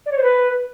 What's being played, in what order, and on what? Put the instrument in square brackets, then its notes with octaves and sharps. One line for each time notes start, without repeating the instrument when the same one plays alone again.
[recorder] D5
C#5
C5
B4